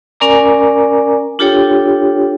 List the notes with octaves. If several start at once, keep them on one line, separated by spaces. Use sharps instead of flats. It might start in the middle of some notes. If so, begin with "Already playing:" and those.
C#4 A#4 D5 G#5 A#5 D6
D4 F4 G4 A4 C#5 G5